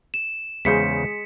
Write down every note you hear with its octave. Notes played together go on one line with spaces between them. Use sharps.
E7
E2 C#3 G#3 G#4 C5 B6 C#7